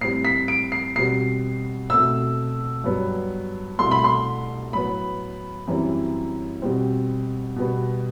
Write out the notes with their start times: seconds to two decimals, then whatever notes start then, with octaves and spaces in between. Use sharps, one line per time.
0.01 A2 G3 C4 C7
0.25 B6
0.48 D7
0.72 C7
0.95 B2 G3 C4 C7
1.90 B2 A3 C4 E6
2.84 G2 F#3 B3
3.78 C2 B2 A3 C6
3.91 B5
4.04 C6
4.73 A2 F#3 B3 B5
5.67 F#2 E3 G3 C4
6.62 B2 G3 C4
7.56 B2 G3 B3